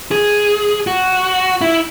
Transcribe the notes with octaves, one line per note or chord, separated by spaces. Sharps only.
G#4
F#4
E4